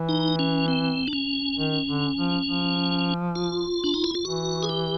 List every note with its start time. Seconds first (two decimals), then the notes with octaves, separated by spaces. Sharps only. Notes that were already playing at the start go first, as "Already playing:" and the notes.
Already playing: E3
0.09 D#4
0.39 C#4
0.68 C4
1.08 D4
1.13 C#4
1.57 D#3
1.88 D3
2.17 F3
2.47 F3
3.35 F4
3.84 D4
3.94 D#4
4.04 E4
4.15 F4
4.25 E3 F#4
4.63 G#4
4.69 G4